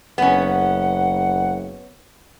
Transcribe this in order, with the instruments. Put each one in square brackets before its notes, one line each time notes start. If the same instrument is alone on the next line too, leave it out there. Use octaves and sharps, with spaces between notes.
[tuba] F#1 [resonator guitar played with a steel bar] B3 C#4 [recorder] F#5